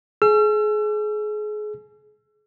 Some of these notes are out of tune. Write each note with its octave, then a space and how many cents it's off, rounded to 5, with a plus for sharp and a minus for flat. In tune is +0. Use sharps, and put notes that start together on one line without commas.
G#4 +30 E6 +40